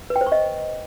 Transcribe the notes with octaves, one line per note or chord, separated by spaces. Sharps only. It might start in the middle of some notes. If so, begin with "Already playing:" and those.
B4
G5
C5
C#6
D#5